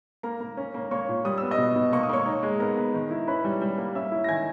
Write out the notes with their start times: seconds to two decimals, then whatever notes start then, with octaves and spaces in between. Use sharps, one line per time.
0.23 A#3 A#4 A#5
0.40 A#3
0.57 C#4
0.74 A#3
0.91 A#3 C#5 C#6
1.09 A#2
1.25 G3 D#6
1.38 B3 E6
1.51 D#5 D#6
1.58 B2
1.76 B2
1.93 A#3 C#6
2.03 D#6
2.09 A#3 C#5 C#6
2.26 D#4
2.43 G#3
2.60 B3 A#4 A#5
2.77 B3
2.94 D#3
3.11 E4
3.27 C#4 B4 B5
3.44 G3
3.61 G3
3.78 A#3
3.95 C#4 E5 E6
4.12 E4
4.24 A#6
4.29 D#3 G#5 G#6